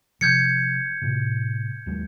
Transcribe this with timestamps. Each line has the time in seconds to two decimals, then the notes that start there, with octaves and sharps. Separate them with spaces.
0.21 C3 F3 G6 G#6 C#7
1.02 A2 C3
1.86 D#2 F#3 G#3